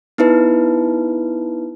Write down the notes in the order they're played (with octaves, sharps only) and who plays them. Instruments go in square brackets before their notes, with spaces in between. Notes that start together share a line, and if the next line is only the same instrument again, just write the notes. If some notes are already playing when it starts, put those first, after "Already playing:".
[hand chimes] B3 D#4 E4 B4